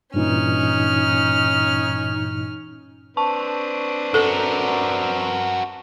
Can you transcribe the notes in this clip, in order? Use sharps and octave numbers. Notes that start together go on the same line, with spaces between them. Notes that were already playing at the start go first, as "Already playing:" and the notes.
G2 A#2 E3 C#4 D#4 F6
C4 D4 B4 A5 C#6
F#4 A4 A#4